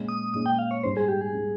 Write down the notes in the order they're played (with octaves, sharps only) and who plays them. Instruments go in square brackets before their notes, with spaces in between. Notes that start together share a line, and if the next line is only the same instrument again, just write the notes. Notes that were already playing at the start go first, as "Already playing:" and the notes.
Already playing: [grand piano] A#2 G#3 C#4
[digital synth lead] D#6
[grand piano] A#2 G#3 C#4 [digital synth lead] D#6
[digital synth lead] G5
F5
C#5
[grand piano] G#2 G3 C#4 [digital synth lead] C5
[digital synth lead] G#4
G4
G#4
[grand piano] G3 C#4